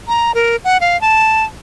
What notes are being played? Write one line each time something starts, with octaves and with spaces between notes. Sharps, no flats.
A#5
A#4
F#5
F5
A5